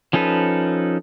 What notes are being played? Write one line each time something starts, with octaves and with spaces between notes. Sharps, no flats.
F3 C#4 D#4 A4 B4